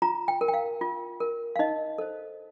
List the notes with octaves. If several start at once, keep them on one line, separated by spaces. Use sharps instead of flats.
F4 A#5
G5
A#4
G5
F5
F4
A#4
F5
D#4 D#5
A4 C5